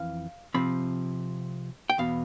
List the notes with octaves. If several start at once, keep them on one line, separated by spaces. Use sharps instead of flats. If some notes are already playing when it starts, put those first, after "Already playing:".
Already playing: F2 E3 F5
C3 F3 C4 B5
G5
E2 B2 B3 F5